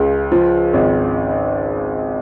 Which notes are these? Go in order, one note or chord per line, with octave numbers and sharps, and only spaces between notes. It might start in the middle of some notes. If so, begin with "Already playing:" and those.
Already playing: C#2 C#3
F3
G#1